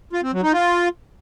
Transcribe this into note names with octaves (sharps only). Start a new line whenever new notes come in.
F4
C4
F#3
D#4
F4